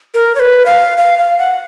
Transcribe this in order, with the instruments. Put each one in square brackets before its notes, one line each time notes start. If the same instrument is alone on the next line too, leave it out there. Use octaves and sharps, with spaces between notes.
[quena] A#4
C#5
B4
F5
F5
F5
F#5